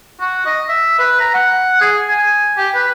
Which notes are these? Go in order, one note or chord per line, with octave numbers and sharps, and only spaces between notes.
F#4
D#5
E5
B4
A#5
F#5
G#4
G#5
G4
B4